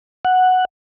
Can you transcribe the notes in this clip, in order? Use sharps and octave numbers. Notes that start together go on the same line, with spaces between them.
F#5